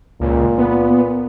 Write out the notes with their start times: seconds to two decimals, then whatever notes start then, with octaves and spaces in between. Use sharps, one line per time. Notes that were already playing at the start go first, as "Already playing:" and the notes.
0.21 C#2 A#2
0.58 B3